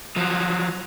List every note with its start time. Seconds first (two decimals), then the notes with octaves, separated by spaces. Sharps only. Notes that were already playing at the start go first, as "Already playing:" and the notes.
0.16 F3 F#3